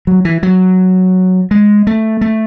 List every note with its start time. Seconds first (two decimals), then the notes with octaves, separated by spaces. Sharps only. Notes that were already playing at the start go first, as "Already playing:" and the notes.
0.07 F#3
0.25 E3
0.43 F#3
1.51 G#3
1.87 A3
2.21 A3